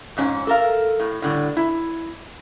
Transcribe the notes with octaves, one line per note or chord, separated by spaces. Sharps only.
F2 G#2 C#4
A4 A#4 F5
A2
A2 D3 G3
E4